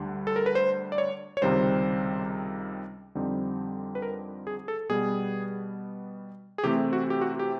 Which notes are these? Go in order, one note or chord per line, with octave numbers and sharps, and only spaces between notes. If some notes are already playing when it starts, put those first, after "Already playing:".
Already playing: D2 D3 G3
A4
A#4
B4
C5
D5
C#5
C#5
C#2 C3 D#3 G3 C5
F2 D3 G3 C4 D#4
B4
A#4
G#4
A4
B2 G3 B3 G#4
G#4
C3 E3 A3 C4 G4
F#4
G4
F#4
G4